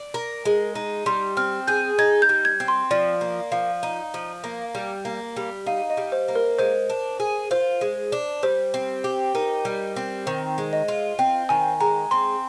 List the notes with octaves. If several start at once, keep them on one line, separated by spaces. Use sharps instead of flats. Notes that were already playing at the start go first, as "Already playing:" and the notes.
Already playing: D5
A#4
G#3
D#4
G3 C6
C4 F6
G#4 G6
D#4 G#6
G6
G3
G#6
C4
C6
F3 D5
A#3
F3 F5
D#4
F3
A#3
G3
A#3
G3
D#4 F5
D#5
G3
C5
A#3
A#4
G#3 C5
D4
G#4
F4 C5
G#3
D4
G3 C5
C4
G4
D#4 A#4
G3
C4
D#3 C5
G#3
D#5
F4
C4 G5
D#3 G#5
G#3 A#5
C4 C6